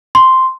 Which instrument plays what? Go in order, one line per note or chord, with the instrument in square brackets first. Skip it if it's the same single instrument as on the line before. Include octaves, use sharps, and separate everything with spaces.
[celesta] C6